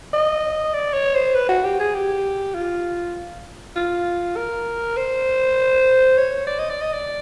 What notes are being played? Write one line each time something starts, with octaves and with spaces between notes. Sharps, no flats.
D#5
D5
C#5
C5
B4
F#4
G4
G#4
G4
F4
F4
A#4
C5
C#5
D5
D#5
D5
D#5
D5